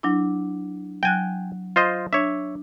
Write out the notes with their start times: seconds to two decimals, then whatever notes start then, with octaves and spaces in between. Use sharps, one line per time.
0.03 F#3 D4 E4
1.03 F#3 G5 G#5 F#6
1.76 F4 C5 D#5
2.13 D4 C#5 E5